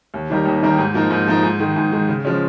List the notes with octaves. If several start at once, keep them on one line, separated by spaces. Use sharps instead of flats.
D#2
D#3 G3 A#3 D#4
D#2
D#3 G3 A#3 D#4
G#2
F3 A#3 D#4
G#2
F3 A#3 D#4
G#2
D#3 G#3
G#2
D#3 G#3
C#3
F3 G#3 C#4